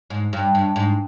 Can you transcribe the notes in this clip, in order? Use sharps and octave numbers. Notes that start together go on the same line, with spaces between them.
G#2
G2
G2
G#2